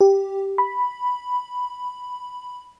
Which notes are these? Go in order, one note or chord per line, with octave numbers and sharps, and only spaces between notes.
G4
B5